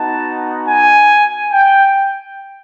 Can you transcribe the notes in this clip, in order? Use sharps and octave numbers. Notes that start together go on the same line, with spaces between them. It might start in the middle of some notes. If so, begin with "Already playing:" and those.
Already playing: B3 D#4 F#4 A5
G#5
G5